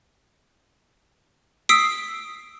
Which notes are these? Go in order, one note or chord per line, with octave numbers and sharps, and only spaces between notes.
D#6 E6 B6 C7 D7